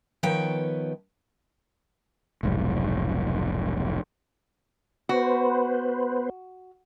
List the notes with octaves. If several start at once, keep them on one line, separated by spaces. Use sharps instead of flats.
D#3 F3 B3 B4 C#5 G5
F1 B1 G#2
B3 F#4 B4 C5